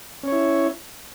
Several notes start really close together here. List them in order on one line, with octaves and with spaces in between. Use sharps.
C#4 C#5 E4